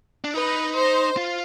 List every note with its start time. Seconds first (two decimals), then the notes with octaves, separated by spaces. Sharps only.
0.24 D4
0.34 D#4 B4
0.75 C5
1.17 F4